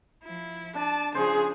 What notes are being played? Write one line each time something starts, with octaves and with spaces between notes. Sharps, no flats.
F3 E4
D4 D5 A5
C#3 F3 G#4 C5